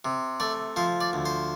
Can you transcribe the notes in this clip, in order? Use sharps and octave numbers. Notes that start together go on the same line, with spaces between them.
C3
A3 D5
F3 C5
D5
D2
C5